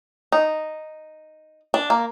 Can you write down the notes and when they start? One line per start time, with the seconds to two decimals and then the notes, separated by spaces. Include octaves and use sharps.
0.32 D#4
1.74 D4
1.90 A#3